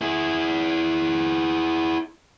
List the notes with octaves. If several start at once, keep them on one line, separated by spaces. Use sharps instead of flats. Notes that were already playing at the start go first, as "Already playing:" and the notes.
E4 G#4